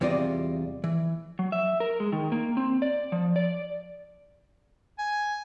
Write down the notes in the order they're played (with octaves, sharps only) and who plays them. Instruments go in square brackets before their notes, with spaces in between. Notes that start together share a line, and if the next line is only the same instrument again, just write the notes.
[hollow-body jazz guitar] E2 C3 G3 F4 D5 D#5
E3
[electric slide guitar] F#3
E5
A#4
G#3
D#3
A#3
C4
D5
F3
D5
[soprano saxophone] G#5